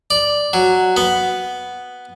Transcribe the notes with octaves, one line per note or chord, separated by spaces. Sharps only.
D5
F#3
B3